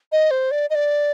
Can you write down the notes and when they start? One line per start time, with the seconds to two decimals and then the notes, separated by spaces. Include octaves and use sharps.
0.12 D#5
0.31 C5
0.51 D5
0.70 D#5
0.75 D5